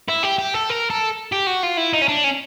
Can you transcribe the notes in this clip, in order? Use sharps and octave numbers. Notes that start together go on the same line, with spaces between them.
E4
G4
G4
A4
A#4
A4
G4
F#4
F4
E4
D#4
C#4
D4
C#4